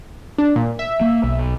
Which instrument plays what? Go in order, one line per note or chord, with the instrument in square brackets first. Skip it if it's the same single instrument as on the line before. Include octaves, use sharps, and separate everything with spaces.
[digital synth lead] D4
A#2
E5
[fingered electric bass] A#3
B1